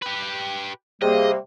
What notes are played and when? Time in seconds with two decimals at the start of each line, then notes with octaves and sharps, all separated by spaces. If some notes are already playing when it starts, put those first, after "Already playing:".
0.02 G4 B4
1.02 C3 G3 A#3 G#4 D#5